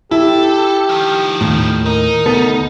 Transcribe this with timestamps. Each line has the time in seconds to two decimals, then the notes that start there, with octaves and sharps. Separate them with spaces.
0.11 E4 G4 A4
0.89 D#3 F3
1.41 D#2 A2
1.86 D#4 A#4
2.26 D2 B3 A4